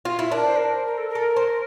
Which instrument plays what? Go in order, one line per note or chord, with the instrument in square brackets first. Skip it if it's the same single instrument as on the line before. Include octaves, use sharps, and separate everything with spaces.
[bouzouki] F4
E4
[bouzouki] D4 [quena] A#4
[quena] C5
A#4
C5
A#4
A4
A#4
[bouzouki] A4
C5